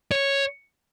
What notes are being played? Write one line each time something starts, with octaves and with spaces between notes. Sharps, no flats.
C#5